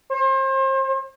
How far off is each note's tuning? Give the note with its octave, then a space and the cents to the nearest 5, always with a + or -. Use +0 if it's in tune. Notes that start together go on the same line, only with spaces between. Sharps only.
C5 +35